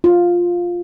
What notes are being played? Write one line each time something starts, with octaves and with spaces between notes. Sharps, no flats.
F4